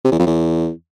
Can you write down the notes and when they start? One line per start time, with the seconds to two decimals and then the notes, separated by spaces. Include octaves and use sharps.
0.05 C3
0.12 E2
0.19 F2
0.27 E2